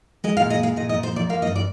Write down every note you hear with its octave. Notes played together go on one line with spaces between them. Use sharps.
G#3 D#5
F5
A#2
D#5
G#3 F5
A#2 D#5
D#5
A#2
C5
F3 D5
A#3 F5
D#5
G2
D5